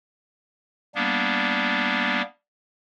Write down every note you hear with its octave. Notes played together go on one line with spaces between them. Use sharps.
G3 A#3 B3 D4